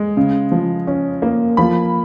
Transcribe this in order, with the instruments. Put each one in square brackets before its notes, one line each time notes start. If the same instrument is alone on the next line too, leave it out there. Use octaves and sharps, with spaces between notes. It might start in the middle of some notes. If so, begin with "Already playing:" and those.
Already playing: [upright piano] G#3
C#3
F3
C#4
A#3
F3 B5